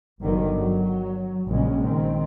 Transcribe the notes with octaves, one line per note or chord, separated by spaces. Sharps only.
G1 D3 D#3 F#3
F#3
A#1 C#3 G#3 C#4
D#3 C4